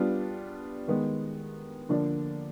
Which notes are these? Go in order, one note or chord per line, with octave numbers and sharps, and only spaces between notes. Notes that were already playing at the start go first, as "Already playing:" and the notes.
Already playing: G3 B3 D4 F4
D#3 G#3 B3
D3 F3 A#3 D4